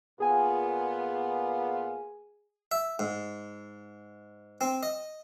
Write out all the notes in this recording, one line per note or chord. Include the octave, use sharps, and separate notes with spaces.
A#2 B3 F4 G#4 G#5
E5
G#2
C4
D#5